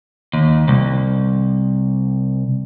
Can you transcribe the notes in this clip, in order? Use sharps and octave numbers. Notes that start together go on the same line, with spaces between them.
D#2
C2